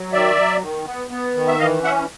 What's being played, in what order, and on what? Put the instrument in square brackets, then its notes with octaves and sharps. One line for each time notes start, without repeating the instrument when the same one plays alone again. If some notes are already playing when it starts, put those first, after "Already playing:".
Already playing: [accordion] F#3
D#3 D5 E5
F#3
D#3
B3
B3
D#3
E5
E3 D#5 F5
C#4 E5 F#5